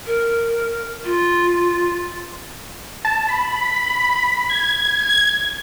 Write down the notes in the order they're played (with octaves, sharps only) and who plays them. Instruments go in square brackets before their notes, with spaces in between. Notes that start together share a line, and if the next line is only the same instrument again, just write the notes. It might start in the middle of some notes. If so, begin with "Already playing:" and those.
[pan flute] A#4
F4
[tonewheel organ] A5
B5
G#6